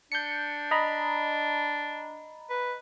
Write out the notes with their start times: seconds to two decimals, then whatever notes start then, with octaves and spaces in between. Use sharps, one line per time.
0.12 D4 G6 C#7
0.71 D#5 A#5 B5
2.50 B4